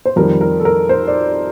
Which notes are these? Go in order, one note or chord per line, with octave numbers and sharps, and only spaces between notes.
C5
F2 D#3 G3 A#4
A#4
A4
A#4
C5
D5